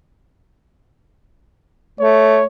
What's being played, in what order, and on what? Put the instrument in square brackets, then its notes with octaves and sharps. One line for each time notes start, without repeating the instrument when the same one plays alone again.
[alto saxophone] A3 [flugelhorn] C#5